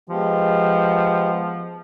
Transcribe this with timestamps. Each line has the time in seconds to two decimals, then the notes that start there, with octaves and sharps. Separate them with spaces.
0.09 F3 G#3 B3 G4